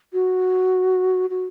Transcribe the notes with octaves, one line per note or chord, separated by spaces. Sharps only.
F#4
F#4